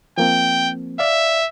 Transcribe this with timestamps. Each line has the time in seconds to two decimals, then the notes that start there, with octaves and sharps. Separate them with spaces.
0.18 F3 A#3 C4 G5
0.99 D5 E5 F5